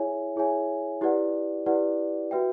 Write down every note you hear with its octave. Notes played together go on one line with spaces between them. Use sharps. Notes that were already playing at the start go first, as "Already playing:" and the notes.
Already playing: E4 G#4 C#5 E5 G#5
E4 G#4 C#5 E5 G#5
E4 G4 B4 D5 F#5
E4 G4 B4 D5 F#5
F#4 B4 E5 G5